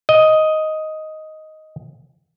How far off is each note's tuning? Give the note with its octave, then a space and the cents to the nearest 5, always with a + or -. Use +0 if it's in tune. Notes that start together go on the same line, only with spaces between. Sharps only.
D#5 +5